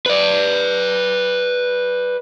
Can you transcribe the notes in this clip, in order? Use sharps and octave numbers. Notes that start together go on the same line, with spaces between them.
B4 D5